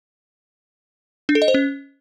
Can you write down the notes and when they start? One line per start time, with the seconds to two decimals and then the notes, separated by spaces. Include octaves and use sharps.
1.29 D4
1.35 A4
1.42 D#5
1.48 C5
1.54 C#4